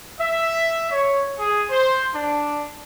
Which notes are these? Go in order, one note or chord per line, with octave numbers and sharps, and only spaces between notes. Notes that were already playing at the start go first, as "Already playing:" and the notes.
E5
C#5
G#4
C5
D4